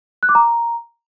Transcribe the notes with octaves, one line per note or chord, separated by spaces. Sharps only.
F#6
D6
A#5